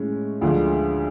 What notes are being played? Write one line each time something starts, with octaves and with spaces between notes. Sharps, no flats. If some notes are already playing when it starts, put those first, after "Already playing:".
Already playing: A2 G#3 C#4
D2 D3 F3 G#3